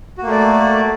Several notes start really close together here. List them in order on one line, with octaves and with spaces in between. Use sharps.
F#4 A#3 A3 D5